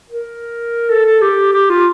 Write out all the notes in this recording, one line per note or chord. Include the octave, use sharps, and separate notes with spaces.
A#4
A4
A4
G4
G4
F4